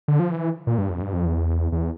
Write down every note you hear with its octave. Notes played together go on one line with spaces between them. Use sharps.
D3
F3
E3
A#2
G2
F2
G2
F2
E2
E2